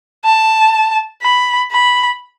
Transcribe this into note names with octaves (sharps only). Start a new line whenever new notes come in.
A5
B5
B5